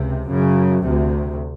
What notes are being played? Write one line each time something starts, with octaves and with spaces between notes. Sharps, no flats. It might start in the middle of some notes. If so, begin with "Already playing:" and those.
Already playing: C#2 C3
F#2 C#3
D2 C3